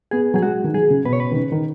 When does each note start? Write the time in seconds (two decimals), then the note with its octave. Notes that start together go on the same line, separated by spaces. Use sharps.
0.11 B3 G#4
0.34 F#3 G#4
0.43 G#3 F#4
0.64 D#3
0.74 F#3 G#4
0.90 C#3
1.05 B2 B4
1.13 C#5
1.20 B2 B4
1.31 D#3
1.36 C#3
1.52 D#3